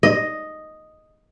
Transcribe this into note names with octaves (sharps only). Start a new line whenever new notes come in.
D#5